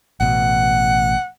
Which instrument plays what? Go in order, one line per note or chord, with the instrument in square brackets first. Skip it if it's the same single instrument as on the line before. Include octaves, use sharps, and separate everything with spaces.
[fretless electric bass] A1 B2 [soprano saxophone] F#5